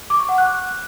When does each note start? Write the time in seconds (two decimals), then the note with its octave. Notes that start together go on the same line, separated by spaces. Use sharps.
0.10 D6
0.19 C#6
0.29 F#5
0.38 F#6